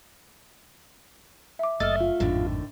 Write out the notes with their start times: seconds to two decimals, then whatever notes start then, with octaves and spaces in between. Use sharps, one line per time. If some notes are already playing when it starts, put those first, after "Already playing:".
1.59 E5 D6
1.80 F#1 A3 D#5 E6 F6 A6
2.00 F4
2.20 G#1 F2 A2 D3 D#3